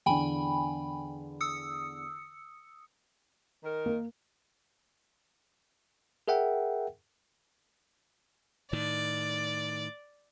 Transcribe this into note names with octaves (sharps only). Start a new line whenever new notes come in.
E2 D3 G5 G#5 B5
D#6 E6 C#7
D#3 A#4
A#3
G#4 A#4 E5 F#5 G5
A2 D#3 D5